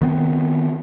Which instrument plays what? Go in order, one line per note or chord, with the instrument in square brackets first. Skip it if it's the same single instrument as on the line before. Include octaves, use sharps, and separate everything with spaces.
[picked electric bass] D#3 B3 C4